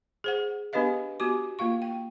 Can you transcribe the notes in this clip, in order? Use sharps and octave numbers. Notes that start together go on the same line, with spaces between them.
G#4 C5 F#5
B3 D4 G4 B4 D#5 F5
B3 F#4 G4 D6
A#3 F4 F5 C#6
G5